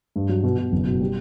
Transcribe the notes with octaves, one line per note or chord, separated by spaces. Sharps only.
G2
F#3
B2
B2
F#1
B2
G3